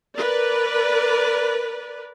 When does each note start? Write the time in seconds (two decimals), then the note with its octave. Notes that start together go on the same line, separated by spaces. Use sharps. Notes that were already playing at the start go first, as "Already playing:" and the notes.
0.16 A#4 B4 D5